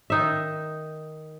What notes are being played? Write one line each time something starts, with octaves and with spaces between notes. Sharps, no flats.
D#3 D#4 E5